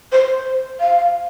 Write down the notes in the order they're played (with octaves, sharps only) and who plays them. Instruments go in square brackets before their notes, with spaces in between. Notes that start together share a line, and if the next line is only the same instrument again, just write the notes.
[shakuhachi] C5
F5